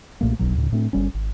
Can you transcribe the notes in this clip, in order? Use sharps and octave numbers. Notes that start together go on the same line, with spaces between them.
B1 A#2 A3 A#3
D1 B1 B2 F#3
D2 A2 C#3
A2 A3 C4 D4
G1 G3 C#4
G#1